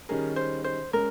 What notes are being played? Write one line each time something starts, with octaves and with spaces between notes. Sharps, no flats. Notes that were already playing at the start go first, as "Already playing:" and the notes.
D#3 G3 C#4 G#4 A#4
C5
C5
G#3 C#4 A#4